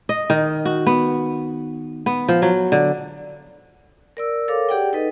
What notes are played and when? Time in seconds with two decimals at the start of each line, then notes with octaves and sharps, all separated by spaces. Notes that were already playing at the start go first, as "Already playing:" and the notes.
0.09 D#5
0.30 D#3
0.65 F#4
0.86 B3
2.06 B3
2.28 F3
2.42 F#3
2.72 D3
4.17 A#4 D5 E6
4.48 A4 A#4 C#5 F5 D6
4.69 G4 G#4 D5 F#5 G5
4.93 D#4 A4 B4 D#5